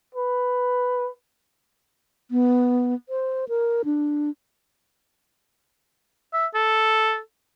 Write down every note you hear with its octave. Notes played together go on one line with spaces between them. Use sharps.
B4
B3
C5
A#4
D4
E5
A4